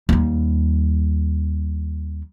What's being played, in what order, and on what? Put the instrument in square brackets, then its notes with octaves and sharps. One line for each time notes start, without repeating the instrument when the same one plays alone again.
[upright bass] D#2 G3